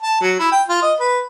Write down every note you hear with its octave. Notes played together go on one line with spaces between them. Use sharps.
A5
F#3
E4
G5
F4
D#5
B4